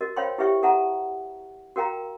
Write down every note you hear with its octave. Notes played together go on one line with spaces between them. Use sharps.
F#4 A#4 D#5
C5 C#5 F5 G5 B5 C6
E4 G4 B4 E5 G5 C#6
A4 E5 F#5 A5 A#5
F#4 A#4 F5 G5 A#5